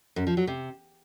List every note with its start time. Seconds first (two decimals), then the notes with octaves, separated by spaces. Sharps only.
0.16 F#2
0.27 F3
0.37 F#3
0.47 C3